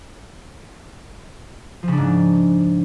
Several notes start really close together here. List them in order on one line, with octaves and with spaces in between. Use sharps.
F3 C#3 D4 G#2